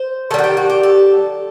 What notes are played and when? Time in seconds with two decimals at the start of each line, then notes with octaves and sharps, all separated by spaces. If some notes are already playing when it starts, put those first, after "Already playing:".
Already playing: C5
0.31 D#3 A4
0.34 G3 F#4
0.44 G4
0.57 F#4
0.70 G4
0.83 A4